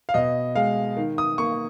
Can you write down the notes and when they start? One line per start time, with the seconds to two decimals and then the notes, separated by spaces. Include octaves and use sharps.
0.09 F5
0.14 B2 D#5
0.55 G#3 F5
0.97 D#3
1.18 D#6
1.38 A#3 C#6